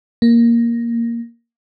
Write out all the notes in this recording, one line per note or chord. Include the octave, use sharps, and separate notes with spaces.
A#3